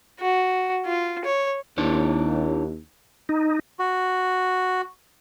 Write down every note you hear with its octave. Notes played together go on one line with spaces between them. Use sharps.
F#4
F4
C#5
D#2 D4 E4 C#5
D#4
F#4